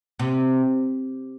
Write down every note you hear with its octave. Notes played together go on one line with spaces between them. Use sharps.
C3